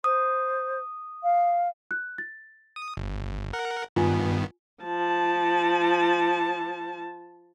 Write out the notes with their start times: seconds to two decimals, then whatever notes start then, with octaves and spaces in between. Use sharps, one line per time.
0.04 C5 D#6
1.23 F5
1.91 F#6
2.18 A6
2.76 D#6
2.97 G1
3.53 A#4 F#5
3.96 G2 D#3 B3 F4 G#5
4.84 F3 A5